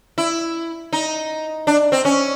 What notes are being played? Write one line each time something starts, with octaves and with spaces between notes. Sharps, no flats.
E4
D#4
D4
C4
C#4